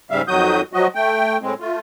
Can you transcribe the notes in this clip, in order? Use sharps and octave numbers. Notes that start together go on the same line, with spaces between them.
G#2 C#3 G3 E5 F5
F2 D#3 F#3 F#4 D#6 G6
F3 F#3 F#4 D#5
A3 G5
A2 G#3 C4
A3 F4